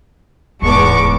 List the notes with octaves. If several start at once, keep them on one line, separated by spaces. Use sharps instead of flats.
D1 E2 G#2 G#3 B3 A4 C#6 D6